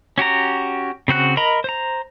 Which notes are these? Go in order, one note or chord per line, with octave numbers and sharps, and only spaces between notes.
C#4 F#4 G4 A#5
C#3 C4 F#4 F#6
A#4 D#5 A#5 B5
C5 A#5